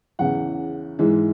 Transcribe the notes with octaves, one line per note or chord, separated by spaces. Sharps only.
E2 C#3 E3 F#5
G#2 E3 G#3